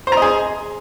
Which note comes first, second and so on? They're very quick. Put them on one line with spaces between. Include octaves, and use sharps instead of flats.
C5 A#5 D#5 G#4